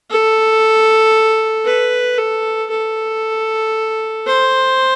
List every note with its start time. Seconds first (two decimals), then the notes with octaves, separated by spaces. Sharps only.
0.11 A4
1.66 B4
2.18 A4
2.70 A4
4.26 C5